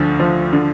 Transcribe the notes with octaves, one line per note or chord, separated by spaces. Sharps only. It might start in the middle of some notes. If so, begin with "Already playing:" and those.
Already playing: D2 D3 F3
F3
D3